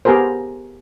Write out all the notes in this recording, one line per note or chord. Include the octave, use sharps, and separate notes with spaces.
B3 G4 G#4 A#4 C5